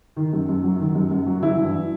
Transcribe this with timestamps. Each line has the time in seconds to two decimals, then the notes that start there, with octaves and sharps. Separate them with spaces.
0.16 D#3
0.33 F#2
0.49 F#2
0.64 F#3
0.80 D#3
0.95 F#2
1.11 F#2
1.26 F#3
1.42 E3 E4
1.59 G2